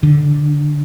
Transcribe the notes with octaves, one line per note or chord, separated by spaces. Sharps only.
D3